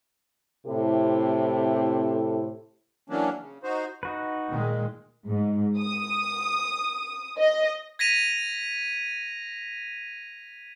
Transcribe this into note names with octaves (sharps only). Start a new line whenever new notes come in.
A2 C3 C4 E4 G4 A4
E3 F#3 A#3 C#4 D4
C#3
D#4 F#4 C5
D#4 F#4 B4
A#2 D#3 G#3
G#2
D#6
D#5
G#6 A#6 B6 D#7 F7